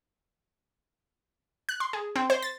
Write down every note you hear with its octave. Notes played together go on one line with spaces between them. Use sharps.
F#6
C6
G#4
C4
C5
A6